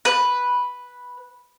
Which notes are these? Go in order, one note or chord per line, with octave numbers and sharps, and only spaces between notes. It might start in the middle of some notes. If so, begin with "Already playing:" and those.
B4